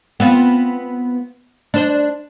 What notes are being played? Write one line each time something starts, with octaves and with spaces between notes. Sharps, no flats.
B3 C4 F4
D4 C5